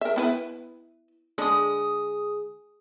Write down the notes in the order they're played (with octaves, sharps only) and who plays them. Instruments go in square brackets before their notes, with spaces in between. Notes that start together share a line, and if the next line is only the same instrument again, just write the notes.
[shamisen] A#4 E5
B3 E4 B4
[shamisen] D3 G#3 D4 [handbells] G#4 D#6